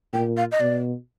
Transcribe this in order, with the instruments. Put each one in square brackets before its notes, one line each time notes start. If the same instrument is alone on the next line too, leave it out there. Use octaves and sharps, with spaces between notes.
[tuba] A#2 [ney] G5
[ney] F5
D#5
[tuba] B2 [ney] D5